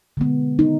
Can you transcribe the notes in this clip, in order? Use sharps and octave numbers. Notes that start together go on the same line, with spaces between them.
D3 G#3 B3
D#4